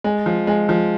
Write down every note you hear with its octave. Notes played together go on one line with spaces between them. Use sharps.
G#3
F3
G#3
F3